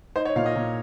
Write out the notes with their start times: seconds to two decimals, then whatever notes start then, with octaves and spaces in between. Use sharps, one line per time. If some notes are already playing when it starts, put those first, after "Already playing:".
0.16 D#4 C5
0.25 C#5
0.36 A#2 F5
0.46 D#5
0.56 A#2